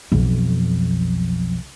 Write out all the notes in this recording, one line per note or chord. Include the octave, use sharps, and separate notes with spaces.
B1 F2